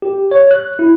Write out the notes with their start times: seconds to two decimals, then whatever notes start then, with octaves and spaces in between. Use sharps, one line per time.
0.02 G4
0.31 C#5
0.51 F#6
0.79 E4